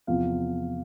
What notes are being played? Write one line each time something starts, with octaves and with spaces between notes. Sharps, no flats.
E2 C3 F3 F4 F5